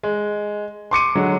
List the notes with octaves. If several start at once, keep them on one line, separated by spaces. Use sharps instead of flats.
G#3
C6 D6 C#7 D#7
D3 F#3 G#3